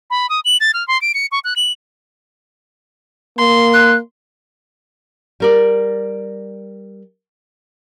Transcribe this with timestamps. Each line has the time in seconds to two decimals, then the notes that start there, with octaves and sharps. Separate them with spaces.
0.10 B5
0.29 D#6
0.45 F#7
0.60 A6
0.74 F6
0.88 C6
1.01 D7
1.14 C#7
1.32 C#6
1.44 F#6
1.56 F#7
3.38 A#3 C6
3.74 F#6
5.40 G3 A#4 D5